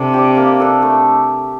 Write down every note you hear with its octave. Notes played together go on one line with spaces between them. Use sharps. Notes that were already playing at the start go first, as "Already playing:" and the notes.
Already playing: C3 D4 A4
G4 D5
A#3
D4 A4
A3